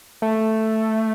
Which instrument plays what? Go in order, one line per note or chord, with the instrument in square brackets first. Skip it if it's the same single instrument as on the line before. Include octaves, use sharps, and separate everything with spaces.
[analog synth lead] A3